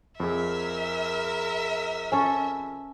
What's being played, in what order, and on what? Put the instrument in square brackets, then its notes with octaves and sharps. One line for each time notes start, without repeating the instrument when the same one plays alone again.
[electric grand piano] F2 G#4 [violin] A#4 E5
[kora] C#4 A4